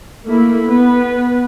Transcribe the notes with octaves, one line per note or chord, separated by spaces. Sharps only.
A3 A#3 E4
B3 B4